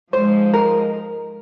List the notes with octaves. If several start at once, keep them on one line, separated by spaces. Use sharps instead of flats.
G#2 F3 G#3 C5
A#4